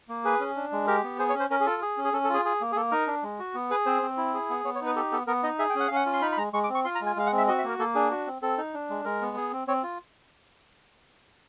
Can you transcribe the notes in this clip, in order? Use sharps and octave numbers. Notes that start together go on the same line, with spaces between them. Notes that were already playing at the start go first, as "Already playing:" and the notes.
A#3
G#4 B4
C#4
D4
G#3
G4 A#4
B3
G#4 C5
C#5
C#4
C5
C#4 A#4
G#4
F4 A4
G#4
C#4
G#4
C#4 A4
A4
F4 G#4
G#4
A#3
G#4
A#3 A4
D#4 A#4
D4
G#3
F#4
B3
G#4 B4
C4 C5
C4
E4
G#4
B3
B3 C#5
C#5
D#4 B4
G4 A4
B3 A4
B3 A#4
D#4 D#5
G#4 E5
G5
C#4
F#5
C#4 F5
F#5
F4
C6
D#4 B5
B5
G#3 A#5
G#3 C#6
D6
C4
C#6
F4 C6
A#5
G#3
G#5
G#3 F5
F#5
C4
E5
F#4 D#5
E5
A#3 A#4
A#3 A4
D4 G#4
F#4
C4
C4 A4
D#4
D4
G#3
G#3 A#4
B3
G#4
C4
C4 C#5
F4